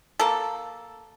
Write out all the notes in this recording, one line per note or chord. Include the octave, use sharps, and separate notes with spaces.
A#3 A4